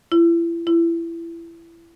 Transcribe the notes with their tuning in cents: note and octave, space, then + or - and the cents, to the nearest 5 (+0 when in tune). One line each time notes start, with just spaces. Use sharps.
E4 +35
E4 +25